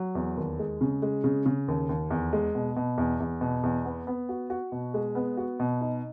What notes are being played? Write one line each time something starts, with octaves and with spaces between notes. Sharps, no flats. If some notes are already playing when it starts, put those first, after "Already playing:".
Already playing: F#3
E2
D#2
G#3
C#3
G#3
C#3
C#3
D#2
D#2
E2
G#3
B2
B2
E2
E2
B2
E2
B3
B3
F#4
F#4
B2
G#3
B3
F#4
B2
D#4